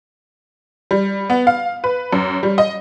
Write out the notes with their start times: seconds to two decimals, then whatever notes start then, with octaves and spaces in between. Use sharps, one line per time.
0.91 G3
1.30 B3
1.47 F5
1.84 B4
2.13 F#2
2.43 G3
2.58 D#5